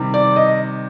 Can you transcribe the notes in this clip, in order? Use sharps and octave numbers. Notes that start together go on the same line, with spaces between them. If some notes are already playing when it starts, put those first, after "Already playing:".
Already playing: C3 D#3 G3
D5
D#5